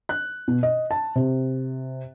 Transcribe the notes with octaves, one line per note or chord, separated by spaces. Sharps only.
F#6
B2
D#5
A5
C3